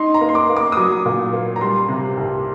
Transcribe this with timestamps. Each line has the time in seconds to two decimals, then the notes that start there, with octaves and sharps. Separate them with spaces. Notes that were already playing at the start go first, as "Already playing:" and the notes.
Already playing: D#4 C6
0.14 A#5
0.21 A#3
0.29 C6
0.35 D6
0.49 A#3
0.57 D6
0.72 D#6
0.77 F#3 D6
1.06 A#2
1.33 A#3
1.56 A#5
1.61 G3 C6
1.89 C3
2.17 C2